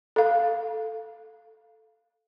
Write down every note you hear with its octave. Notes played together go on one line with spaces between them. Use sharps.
A4 F5